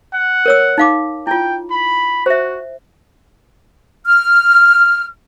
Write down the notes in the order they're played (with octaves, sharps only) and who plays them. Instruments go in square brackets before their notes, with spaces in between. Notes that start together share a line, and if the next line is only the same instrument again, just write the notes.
[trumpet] F#5
[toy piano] A#4 C#5 E6
D#4 F5 D6
[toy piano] E4 F4 [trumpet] G5
[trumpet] B5
[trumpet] F#4 [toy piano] C5 E5
[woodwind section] F6